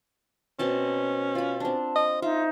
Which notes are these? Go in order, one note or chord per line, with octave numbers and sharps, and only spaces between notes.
B2 C4 C#4 A5
F4 B5
C4 D4 A5
D#5
D#4 F4 E5